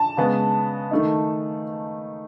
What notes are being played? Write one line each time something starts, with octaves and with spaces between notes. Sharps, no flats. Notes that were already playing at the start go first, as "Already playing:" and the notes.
Already playing: A5
C#3 G#3 B3
D#3 A3 D#4